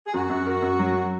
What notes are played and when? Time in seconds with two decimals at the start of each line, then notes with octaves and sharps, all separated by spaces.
0.07 G#4
0.14 F#2 F#4
0.30 F#2
0.46 A#4
0.62 F#2
0.79 F#3